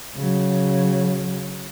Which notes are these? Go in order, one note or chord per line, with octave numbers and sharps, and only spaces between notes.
C#3 F#3